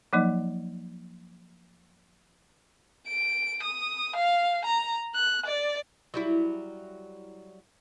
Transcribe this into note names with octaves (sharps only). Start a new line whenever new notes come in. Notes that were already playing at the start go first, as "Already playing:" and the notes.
F3 F#3 A#3 D#4 D#5
D7
D#6
F5
A#5
F#6
D5
F#3 G3 E4